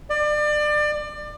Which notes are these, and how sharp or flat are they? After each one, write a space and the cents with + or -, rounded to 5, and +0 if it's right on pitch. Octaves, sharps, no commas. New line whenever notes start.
D5 +30